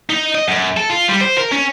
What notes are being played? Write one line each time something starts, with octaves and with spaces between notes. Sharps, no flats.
D#4
D#5
F#2
A4
F4
G3
C5
A#4
C#4